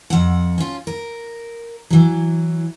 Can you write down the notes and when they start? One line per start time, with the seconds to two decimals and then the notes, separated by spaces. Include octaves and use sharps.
0.10 F2 F#5
0.58 C#4 F4
0.87 A#4
1.90 E3 F#3